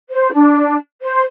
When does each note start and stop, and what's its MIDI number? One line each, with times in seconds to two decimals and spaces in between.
0.10 0.31 72
0.33 0.76 62
1.03 1.23 72